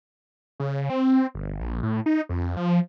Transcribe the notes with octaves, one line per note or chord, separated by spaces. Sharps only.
C#3
C4
G1
A#1
A2
D#4
F2
F3